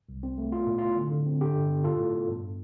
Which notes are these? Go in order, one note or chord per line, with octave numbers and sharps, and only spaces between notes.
C2
C4
A3
B3 F4
A2
A2 F4
D3
D3
C4
D3 G4
G2
B3
A2 F4 A4
A2
B3
G2